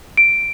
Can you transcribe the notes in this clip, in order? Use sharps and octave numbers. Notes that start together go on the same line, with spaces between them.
D7